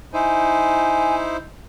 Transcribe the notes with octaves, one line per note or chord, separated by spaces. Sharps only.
D#4 E4 C5 G#5